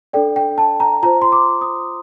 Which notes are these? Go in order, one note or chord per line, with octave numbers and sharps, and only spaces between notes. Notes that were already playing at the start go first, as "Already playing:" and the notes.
D4 A4 D5 G5
G5
A5
A#5
F4 C5 A#5
C6
D6
D#6